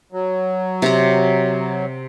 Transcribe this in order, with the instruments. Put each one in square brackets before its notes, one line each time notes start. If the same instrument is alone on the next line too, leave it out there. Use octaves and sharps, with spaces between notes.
[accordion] F#3
[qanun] C3 A#5